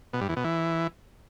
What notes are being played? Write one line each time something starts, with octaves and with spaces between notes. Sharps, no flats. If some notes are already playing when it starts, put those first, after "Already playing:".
B2
G2
E2
B2
E3